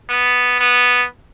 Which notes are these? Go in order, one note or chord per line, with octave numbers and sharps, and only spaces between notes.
B3
B3